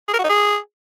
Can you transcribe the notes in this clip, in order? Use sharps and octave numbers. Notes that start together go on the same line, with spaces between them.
G#4
A#4
F#4
D#4
G#4